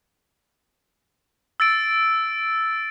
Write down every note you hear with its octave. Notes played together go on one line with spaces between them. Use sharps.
E6 A6 D7